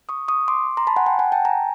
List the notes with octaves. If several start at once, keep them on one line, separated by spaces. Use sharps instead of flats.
C#6 D#6
C#6 D#6
C6 D6
A#5 C6
A5 B5
F#5 G#5
G5 A5
F#5 G#5
G5 A5
G#5 A#5